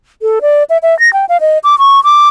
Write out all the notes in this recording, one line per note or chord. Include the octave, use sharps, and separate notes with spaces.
A4
D5
E5
E5
A#6
G5
F5
D#5
D6
C#6
D6